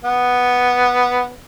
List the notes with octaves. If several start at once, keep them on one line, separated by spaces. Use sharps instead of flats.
B3